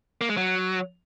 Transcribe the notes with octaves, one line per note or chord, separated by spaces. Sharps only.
A#3
G#3
F#3